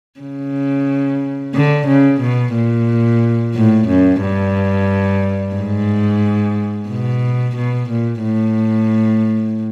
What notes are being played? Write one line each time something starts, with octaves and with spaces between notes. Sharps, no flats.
C#3
D3
C#3
B2
A#2
A2
F#2
G2
G#2
B2
B2
A#2
A2